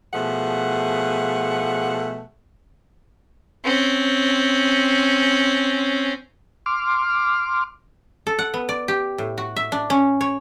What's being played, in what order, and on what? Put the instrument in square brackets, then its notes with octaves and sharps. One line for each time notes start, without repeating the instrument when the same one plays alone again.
[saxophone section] B2 F3 A3 G#4 F#5
[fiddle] C4 C#4
[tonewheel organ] C6 D6 F6
[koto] A4
F#5
B3
D5
G4
A2
F#4
E5
D4
C#4
C#5